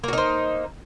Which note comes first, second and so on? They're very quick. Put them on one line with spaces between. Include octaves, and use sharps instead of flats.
A#3 F#4 D#4 C5